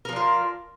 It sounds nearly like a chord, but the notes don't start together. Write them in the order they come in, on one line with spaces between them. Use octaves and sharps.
A#4 F3 D4 F4